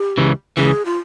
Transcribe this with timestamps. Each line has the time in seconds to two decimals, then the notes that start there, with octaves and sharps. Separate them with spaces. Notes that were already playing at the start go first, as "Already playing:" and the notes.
Already playing: G4
0.18 C#2 C#3 E3
0.57 C#2 C#3 E3 G#4
0.86 F4